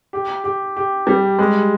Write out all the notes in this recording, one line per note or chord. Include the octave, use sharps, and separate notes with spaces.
G4
G4
G4
G3
G#3